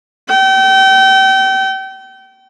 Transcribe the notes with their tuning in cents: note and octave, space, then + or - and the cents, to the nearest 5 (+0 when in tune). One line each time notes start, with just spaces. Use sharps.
G5 -35